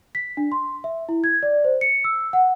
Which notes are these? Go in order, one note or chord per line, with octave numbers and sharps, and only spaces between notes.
B6
D4
C6
E5
E4
G#6
D5
C5
C#7
E6
F#5